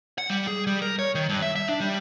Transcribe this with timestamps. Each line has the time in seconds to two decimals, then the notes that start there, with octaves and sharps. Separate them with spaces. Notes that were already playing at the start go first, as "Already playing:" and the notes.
0.18 F#5
0.30 G3
0.47 G#4
0.67 G3
0.82 A#4
0.99 C#5
1.15 D#3
1.29 G2
1.42 E5
1.56 E5
1.69 D4
1.80 G3